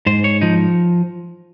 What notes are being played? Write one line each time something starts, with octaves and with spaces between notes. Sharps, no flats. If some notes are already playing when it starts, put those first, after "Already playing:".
G#2 C5
C#5
F3 D#4